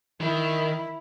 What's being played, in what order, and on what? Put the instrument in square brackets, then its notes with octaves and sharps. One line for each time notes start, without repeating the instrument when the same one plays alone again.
[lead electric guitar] D#3 [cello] E4